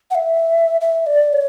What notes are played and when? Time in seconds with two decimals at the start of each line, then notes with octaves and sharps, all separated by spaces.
0.11 F#5
0.15 E5
0.81 E5
1.07 D5
1.33 C#5